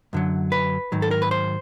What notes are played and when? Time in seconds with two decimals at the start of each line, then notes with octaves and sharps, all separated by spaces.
0.13 F#2 D3 F#3
0.52 B4
0.92 G#2 D#3 F#3
1.02 A4
1.11 A#4
1.22 B4
1.31 C5